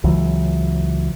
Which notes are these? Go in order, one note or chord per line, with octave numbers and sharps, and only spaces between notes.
C#2 E3 F#3